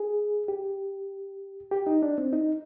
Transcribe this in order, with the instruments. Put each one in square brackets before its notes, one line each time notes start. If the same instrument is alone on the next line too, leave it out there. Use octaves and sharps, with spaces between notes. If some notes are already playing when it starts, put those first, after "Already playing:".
Already playing: [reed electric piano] G#4
G4
G4
D#4
D4
C4
D#4